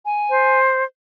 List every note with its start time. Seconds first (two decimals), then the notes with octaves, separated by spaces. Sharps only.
0.06 G#5
0.29 C5